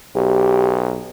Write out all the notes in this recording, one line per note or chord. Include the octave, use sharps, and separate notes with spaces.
B1 G4